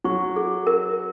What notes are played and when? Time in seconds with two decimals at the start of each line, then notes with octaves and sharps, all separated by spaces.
0.04 F#3 C#6
0.36 G#4
0.67 A#4